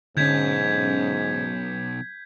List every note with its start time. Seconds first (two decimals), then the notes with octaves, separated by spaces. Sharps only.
0.17 B1 G#2 D3 C#4 G6 G#6 B6